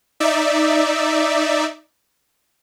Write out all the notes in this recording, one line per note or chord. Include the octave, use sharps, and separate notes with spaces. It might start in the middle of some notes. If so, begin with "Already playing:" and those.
D#4 D5 E5